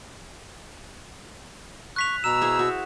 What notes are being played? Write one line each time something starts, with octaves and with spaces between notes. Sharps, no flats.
C#6 F#6 B6 F7
B2 A#5 E6 E7
E4 G#4 C5
F#4